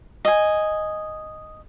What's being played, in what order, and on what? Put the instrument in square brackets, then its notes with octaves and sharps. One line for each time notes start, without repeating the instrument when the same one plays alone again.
[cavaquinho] D#5 G#5